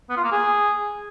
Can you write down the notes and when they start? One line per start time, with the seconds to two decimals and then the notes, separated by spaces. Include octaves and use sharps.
0.10 B3
0.17 F4
0.24 A#3
0.32 G#4